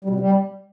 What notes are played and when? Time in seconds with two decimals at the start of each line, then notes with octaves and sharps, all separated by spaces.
0.05 G3
0.10 B2
0.15 C3
0.20 G3